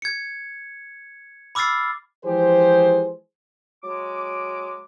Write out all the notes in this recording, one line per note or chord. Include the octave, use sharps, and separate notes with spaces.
G#6 C#7
B5 D6 E6 F6 A6 C7
E3 F3 G#3 G4 G#4 C5
F#3 G#3 D6